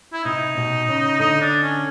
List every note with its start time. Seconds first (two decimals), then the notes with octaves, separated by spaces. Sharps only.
0.13 E4
0.24 C3 D#4
0.57 B2
0.88 C#3
1.19 D3 D#4
1.41 D4
1.63 C#4